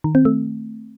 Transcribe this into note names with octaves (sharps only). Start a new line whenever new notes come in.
D#3
C4
A3